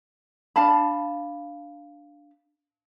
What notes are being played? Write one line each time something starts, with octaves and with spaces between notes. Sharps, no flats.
D4 F5 A5 B5